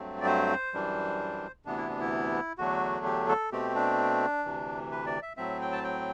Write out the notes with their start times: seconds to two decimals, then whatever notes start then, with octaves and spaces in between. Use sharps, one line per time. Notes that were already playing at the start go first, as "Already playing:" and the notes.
Already playing: G2 F#3 A3 C4
0.21 D5
0.26 C5
0.73 F#2 E3 G3 D4
1.65 D2 C3 E3 B3 D4
1.77 E4
1.89 D4
2.00 E4
2.58 E2 D3 F#3 A3 D4 F#4
3.05 G4
3.29 A4
3.52 B2 A3 C4 G4
3.75 D4
4.45 D2 C3 E3
4.92 B4
5.06 D5
5.22 E5
5.37 A2 F#3 C4 E5
5.61 G5
5.72 A5
5.84 G5